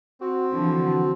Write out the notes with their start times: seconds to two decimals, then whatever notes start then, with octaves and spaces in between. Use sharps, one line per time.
0.21 C4 F#4
0.52 D3 E3 F3